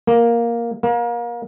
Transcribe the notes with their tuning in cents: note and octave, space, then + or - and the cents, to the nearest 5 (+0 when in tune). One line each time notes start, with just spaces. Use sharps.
A#3 +5
A#3 +30